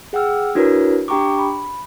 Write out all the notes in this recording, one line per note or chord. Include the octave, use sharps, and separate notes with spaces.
G#4 F#5 G5 E6 F6
D4 E4 F#4 A#4 B4 C#5
D4 G4 G5 A#5 C#6 D6
B5